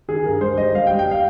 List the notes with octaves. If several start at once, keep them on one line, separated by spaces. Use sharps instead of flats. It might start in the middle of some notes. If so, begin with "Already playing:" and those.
D#3 G#4
G2 A#4
G3 C5
G3 D#5
G3 F5
G5
G3
G5
F5